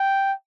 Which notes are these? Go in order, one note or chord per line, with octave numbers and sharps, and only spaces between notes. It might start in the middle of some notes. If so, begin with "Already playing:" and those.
Already playing: G5